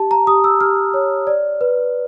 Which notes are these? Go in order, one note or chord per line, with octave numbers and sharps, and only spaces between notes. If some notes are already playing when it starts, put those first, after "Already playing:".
Already playing: G4 A5
A#5
G4 D#6
E6
G4 F6
C#5
D5
B4